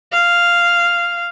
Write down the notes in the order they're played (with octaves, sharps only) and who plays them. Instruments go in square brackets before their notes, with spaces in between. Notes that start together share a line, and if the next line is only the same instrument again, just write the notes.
[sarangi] F5